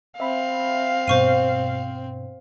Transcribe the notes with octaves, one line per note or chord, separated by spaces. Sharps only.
C4 E5 F5 B5
G2 B2 C5 C#6 D#7